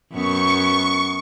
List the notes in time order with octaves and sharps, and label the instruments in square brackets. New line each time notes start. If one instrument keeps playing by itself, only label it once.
[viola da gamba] F#2 B3 [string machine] C#6